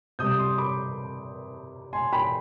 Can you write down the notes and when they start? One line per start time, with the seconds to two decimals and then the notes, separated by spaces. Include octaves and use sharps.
0.19 C3 G3 D#6 G6
0.38 C6 D#6
0.58 B5 D6
1.93 G#5 C6
2.13 G5 B5